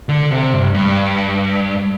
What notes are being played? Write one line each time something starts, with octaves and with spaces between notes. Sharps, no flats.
D3
C3
G2
G2